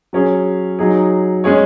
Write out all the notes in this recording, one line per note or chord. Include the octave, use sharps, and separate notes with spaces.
F#3 C#4 G#4
F#3 D#4 G#4
G#3 C#4 G#4 C#5